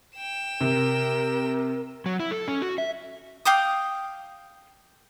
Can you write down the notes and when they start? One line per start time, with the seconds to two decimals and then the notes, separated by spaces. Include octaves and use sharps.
0.16 G5 E7
0.61 C3 A#4
2.06 F#3
2.20 E4
2.31 A4
2.48 C#4
2.62 F#4
2.78 E5
3.45 F5 G5 D6 D#6